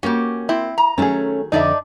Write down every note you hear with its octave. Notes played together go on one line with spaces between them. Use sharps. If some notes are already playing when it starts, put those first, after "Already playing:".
A#3 C#4 F#4 G4
C4 E4
A#5
D#3 F#3 A3 C#4 G#4
F2 D3 D4 D#4 D5 E5